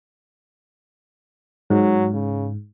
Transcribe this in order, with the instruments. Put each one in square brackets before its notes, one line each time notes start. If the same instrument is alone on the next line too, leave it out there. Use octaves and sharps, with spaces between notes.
[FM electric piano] G#2 [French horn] F#3
[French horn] C#3